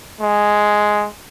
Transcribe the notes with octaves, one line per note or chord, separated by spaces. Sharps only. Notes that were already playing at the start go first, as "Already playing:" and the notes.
G#3